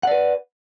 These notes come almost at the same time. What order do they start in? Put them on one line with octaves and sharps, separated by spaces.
F#5 D5 B4